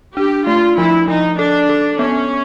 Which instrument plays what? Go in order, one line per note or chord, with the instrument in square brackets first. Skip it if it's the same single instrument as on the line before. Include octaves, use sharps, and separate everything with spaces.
[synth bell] D4 [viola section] G4
[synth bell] A3 [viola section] F4
[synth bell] F3 [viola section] E4
[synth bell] F3 [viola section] D#4
[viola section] D4 [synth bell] A4
[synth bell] A4
[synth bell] B3 [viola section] C#4